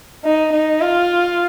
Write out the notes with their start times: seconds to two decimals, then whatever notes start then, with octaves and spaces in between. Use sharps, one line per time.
0.25 D#4
0.53 D#4
0.81 F4